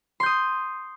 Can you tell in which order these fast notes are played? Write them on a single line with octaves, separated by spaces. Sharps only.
C6 G6 D#6